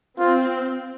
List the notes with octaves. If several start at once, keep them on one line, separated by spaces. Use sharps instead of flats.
C4 F4